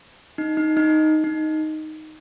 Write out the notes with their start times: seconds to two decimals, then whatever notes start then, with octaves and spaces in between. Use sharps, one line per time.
0.38 D#4
0.57 D#4
0.77 D#4
1.24 D#4